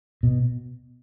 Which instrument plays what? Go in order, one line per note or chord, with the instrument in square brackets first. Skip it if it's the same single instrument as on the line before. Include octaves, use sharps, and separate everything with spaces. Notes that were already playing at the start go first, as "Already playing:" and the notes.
[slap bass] B2